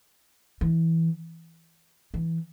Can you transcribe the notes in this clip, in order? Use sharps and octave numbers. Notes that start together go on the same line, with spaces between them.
E3
E3